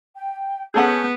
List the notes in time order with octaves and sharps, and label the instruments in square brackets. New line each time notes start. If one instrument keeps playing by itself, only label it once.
[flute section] G5
[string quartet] B3 [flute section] C#4 G6 [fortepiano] G#4 A4 F#5